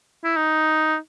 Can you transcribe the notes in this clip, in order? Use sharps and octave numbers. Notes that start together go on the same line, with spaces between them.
E4
D#4